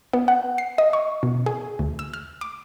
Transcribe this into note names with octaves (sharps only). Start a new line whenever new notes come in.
B3
F#5
C7
D#5
C#6
B2
G#4
D2
E6
F6
D6